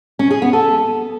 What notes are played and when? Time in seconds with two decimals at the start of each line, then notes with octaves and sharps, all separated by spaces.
0.19 C#4
0.31 G#4
0.42 B3
0.53 A4